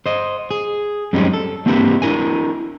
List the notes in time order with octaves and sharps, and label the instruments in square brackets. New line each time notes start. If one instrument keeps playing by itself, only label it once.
[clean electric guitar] C5 D#5
G#4
F#2 G3 G#3 C4 C#4 D#4
A4
A#3 C4 D4 E4 G4 B4
D4 E4 A#4 G#5